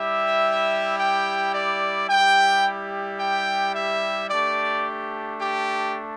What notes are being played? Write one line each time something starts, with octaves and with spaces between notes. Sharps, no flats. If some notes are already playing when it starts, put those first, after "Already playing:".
Already playing: G3 E4 G4 E5
G5
D5
G3 E4 G4 G5
G5
E5
A3 D4 G4 D5
G4